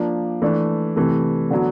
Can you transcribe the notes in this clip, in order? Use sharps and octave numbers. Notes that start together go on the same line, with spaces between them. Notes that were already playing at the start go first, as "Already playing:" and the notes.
Already playing: F3 A#3 D4
E3 A3 D4
C3 E3 A3
D3 F#3 B3